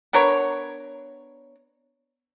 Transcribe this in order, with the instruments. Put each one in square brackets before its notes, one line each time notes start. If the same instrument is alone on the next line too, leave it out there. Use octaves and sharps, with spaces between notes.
[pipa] B3 D4 A#4 C#5